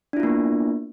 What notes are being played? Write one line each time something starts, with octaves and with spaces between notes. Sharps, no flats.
A#3 B3 D4 E4 F4